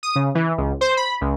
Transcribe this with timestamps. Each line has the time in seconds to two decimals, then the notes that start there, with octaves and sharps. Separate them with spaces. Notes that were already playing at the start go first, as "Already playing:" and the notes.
0.03 D#6
0.15 C#3
0.35 E3
0.58 C#2
0.81 C5
0.97 B5
1.21 C#2